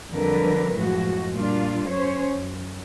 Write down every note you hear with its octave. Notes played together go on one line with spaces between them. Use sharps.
F2 D3 F#3 G3 A#4 B4
F#2 A2 F3 G#3 F#4
A#2 G3 D4 F4
F#2 C#4 C5 C#5
F#2